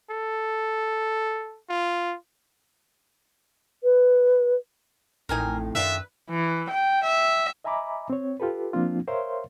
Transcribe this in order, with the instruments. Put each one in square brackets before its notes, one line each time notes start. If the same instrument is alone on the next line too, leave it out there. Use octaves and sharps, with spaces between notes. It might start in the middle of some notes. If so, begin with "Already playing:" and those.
[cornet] A4
F4
[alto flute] B4
[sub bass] A1 [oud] F2 A2 D#4 [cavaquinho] A#4 G#5
[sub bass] F#2 [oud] D#3 D4 F4 [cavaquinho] B4 [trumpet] E5
[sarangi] E3
G5
E5
[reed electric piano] D#5 E5 G#5 A#5 B5 D6
C4 C#5
F4 G4 A4 B4
F3 A#3 C4 D4 F4
A#4 C5 C#5 E5 F5 C6